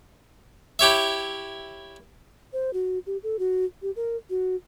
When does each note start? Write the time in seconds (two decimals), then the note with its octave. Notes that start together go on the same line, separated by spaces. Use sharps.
0.79 E4 G4 C#5 E5
2.53 C5
2.73 F#4
3.07 G4
3.23 A4
3.39 F#4
3.82 G4
3.96 A#4
4.30 F#4